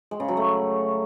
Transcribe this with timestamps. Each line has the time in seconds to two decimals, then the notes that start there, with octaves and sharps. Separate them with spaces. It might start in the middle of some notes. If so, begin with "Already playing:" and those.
0.11 G#3
0.20 C#3
0.28 F#3
0.37 A3